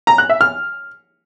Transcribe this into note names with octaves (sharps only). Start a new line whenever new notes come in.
A#5
F#6
E5
F6